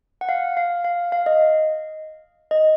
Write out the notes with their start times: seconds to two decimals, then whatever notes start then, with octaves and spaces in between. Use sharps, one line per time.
0.21 F#5
0.29 F5
0.57 F5
0.84 F5
1.12 F5
1.26 D#5
2.51 D#5